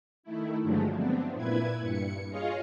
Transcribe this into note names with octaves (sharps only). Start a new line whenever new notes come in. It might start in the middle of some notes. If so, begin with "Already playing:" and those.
D#3 A3 E4
G2 D3 F3 F#3 G#3 A3
B3 C4 D4
A#2 E4 B4 G#6
G2 C#7
F4 G#4 C#5 D#5 F5